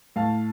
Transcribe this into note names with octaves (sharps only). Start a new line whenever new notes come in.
A2 F5 A5